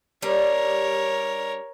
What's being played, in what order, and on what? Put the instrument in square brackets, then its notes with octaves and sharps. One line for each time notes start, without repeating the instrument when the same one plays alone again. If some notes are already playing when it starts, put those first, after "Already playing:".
[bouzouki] G3 D4 [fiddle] A#4 C#5